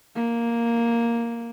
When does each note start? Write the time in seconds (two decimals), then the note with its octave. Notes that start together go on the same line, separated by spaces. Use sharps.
0.16 A#3